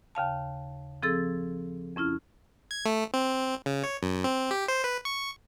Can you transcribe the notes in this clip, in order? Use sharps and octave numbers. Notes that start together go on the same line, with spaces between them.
D#2 C#3 F5 A5
F3 C4 G#4 A4 E6 A6
F2 C#4 E4 F6
G#6
A3
C4
C#3
C#5
F#2
C4
G4
C5
B4
C#6